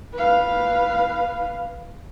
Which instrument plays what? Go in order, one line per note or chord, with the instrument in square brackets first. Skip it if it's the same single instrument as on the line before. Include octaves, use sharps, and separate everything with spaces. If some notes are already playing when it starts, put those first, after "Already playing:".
[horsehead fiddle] B4 F5